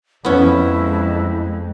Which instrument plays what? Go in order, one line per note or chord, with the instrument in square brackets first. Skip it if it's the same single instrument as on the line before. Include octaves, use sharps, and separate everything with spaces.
[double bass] F2 [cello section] G#3 [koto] B3 C#4 [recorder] E4